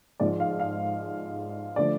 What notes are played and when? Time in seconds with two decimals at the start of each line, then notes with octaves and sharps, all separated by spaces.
0.20 G#2 F3 G#3 D5
0.40 F5
0.59 F5
1.76 D3 F3 A3 D5